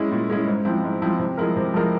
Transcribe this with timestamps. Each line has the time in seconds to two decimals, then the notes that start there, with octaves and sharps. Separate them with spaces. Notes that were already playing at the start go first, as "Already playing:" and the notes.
Already playing: G#3 C#4 E4
0.11 A#2
0.30 G#3 C#4 E4
0.47 G#2
0.65 F3 C4 E4
0.84 G#2
1.02 F3 C4 E4
1.19 C3
1.37 F3 G#3 E4 A#4
1.56 C3
1.74 F3 G#3 E4 A#4